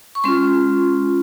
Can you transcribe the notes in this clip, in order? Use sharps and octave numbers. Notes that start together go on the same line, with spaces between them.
C#6
G#3 C#4 F4 C6